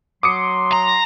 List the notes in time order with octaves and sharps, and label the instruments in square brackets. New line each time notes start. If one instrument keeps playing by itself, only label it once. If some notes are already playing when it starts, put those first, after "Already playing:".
[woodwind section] F#3 C6 [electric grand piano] D6 D#6 C#7
[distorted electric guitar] A#5